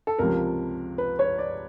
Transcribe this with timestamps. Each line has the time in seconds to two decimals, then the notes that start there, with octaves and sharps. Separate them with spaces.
0.07 A4
0.19 C#2 C3 F3 A#4
0.98 B4
1.19 C#5
1.38 D5